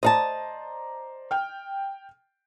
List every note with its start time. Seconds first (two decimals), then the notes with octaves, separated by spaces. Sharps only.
0.03 C5 D5 D#5 F5 A5 A#5
1.31 G5 F6